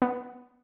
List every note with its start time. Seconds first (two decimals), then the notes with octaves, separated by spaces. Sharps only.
0.02 B3